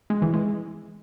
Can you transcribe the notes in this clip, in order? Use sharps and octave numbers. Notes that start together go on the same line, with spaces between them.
G#3
E3
G#3